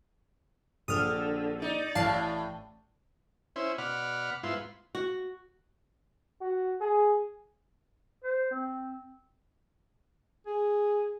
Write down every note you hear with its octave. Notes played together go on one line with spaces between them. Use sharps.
A#1 D3 D#6 F6
D#4 D5
A1 A2 F5 A5 C7
C#4 E4 C5
B2 D5 F#5 B5 F6
G#2 B3 E4 F4 C6
F#4
F#4
G#4
C5
C4
G#4